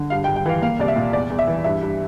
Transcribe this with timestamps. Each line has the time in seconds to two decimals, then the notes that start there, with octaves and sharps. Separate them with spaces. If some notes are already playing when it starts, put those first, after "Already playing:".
Already playing: D3
0.10 G2 F5
0.24 G5
0.27 G2
0.36 G5
0.46 E3 F5
0.62 A#3 F5
0.79 C2 D5
0.88 E5
0.96 A#2
1.13 E2 D5
1.30 E2
1.39 E5
1.47 E3
1.64 G2 E5
1.82 G2